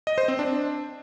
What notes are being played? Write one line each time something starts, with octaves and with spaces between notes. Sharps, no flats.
D#5
C5
C4
D4